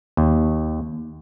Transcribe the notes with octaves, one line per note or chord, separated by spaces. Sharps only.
D#2